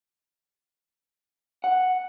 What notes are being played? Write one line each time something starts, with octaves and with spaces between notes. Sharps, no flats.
F#5